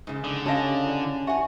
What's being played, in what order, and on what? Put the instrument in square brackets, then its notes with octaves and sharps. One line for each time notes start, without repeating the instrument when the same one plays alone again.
[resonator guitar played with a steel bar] G#2 C#3
[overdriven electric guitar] D3 [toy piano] D#6
[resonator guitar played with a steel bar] C#3 D#5 [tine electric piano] C#4 A5 [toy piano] G4 F5
[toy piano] E4 D5
[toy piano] G4 E5 C#6 [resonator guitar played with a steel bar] F#5 G#5